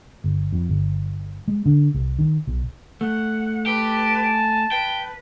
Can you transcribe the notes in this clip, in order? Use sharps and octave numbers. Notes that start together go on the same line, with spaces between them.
G1
F2
G1
G#3
D3
C2
D#3
B1
A3 F#5
G4 B4 A5
G#5
B4 G5